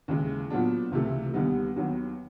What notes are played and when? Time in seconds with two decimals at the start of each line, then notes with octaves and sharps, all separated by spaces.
0.08 D#2 C#3 E3 G#3
0.50 A#2 F#3 B3 D4
0.91 C#2 C3 E3 A3
1.33 D#2 D3 G3 B3 D#4
1.76 D#2 D#3 F#3 B3